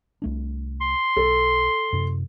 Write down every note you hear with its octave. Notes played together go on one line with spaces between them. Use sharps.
C2 A3 D4
C6
B1 A4
F#2 C3